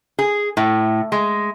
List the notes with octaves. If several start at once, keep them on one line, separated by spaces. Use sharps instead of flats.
G#4
A2
G#3